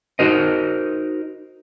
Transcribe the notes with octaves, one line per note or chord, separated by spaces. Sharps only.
D#4 F#4 A#4 C5 D#5